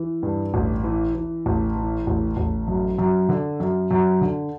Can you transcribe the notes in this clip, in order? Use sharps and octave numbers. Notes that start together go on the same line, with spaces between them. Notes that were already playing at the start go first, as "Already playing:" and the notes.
Already playing: E3
G2
A1
E3
E3
A1
E3
A1
A1
F#2
F#2
D3
F#2
F#2
D3